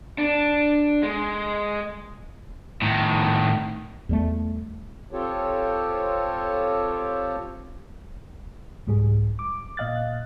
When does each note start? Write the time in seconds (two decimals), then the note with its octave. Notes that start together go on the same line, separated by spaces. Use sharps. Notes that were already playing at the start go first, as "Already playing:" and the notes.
0.18 D4
1.03 G#3
2.82 A2 D#3
4.09 E2 G3 A3
5.11 C4 F4 G4 A4 C#5
8.87 C2 G#2 G3 G#4
9.39 D6
9.77 A#2 D#5 F5 F#6 A6